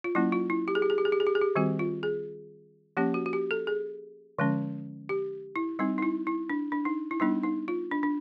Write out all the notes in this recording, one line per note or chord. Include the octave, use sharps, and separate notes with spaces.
F4
F#3 A#3 C#4 E4
F4
E4
G4
G#4
G4
G#4
G4
G#4
G4
G#4
G4
G#4
G4
D#3 G3 C4 F#4
F4
G#4
F3 A#3 C#4 G4
F#4
F#4
G4
A4
G#4
D3 F3 G#3 C#4
G4
E4
G3 C4 D#4
D#4
E4
E4
D4
D4
D#4
E4
G3 B3 D4 D#4
D#4
F4
D4
D4